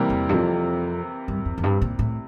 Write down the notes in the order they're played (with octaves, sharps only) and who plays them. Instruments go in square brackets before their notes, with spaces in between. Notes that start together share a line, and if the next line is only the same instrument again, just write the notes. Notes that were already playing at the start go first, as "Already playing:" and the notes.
Already playing: [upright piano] C3 E3 G3 A#3
[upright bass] E2
G2
F2
G2
F2
F2
G2
A#2
A2